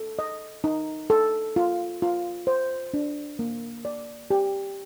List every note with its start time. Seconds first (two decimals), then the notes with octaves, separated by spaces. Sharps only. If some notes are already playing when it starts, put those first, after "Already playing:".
Already playing: A4
0.19 D#5
0.64 D#4
1.10 A4
1.56 F4
2.02 F4
2.47 C5
2.94 D4
3.39 A#3
3.85 D5
4.31 G4